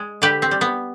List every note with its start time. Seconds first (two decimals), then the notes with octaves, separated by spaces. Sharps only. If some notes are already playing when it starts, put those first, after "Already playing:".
Already playing: G#3
0.22 D3 G4 B4
0.42 C4
0.51 G3
0.61 B3